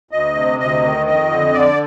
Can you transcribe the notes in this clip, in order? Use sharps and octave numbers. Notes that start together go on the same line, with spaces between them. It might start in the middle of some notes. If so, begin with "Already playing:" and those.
D2 D#5
C3
D2 D#5
D#3
F2 D#5
D3
D3 D5